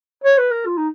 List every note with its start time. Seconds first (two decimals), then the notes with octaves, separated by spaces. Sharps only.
0.24 C#5
0.38 B4
0.52 A#4
0.66 F4
0.78 D#4